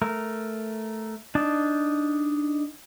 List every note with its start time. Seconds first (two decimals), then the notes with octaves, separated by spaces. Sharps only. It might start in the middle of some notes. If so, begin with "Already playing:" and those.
0.02 A3 A#4
1.35 D4 D#4 A5